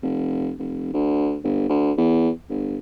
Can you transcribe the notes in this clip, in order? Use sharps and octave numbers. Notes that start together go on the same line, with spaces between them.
F1
F1
D2
G1
D2
E2
G1